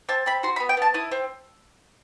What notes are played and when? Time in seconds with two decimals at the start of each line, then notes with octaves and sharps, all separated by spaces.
0.09 C4 A5
0.26 C4 B5
0.43 F#4 C6
0.56 B5
0.60 B3
0.69 G5
0.77 B3 A5
0.94 E4 D#6
1.11 C4